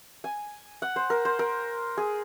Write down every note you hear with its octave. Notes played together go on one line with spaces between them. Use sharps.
G#5
F#5
C5
A#4
C5
A#4
G#4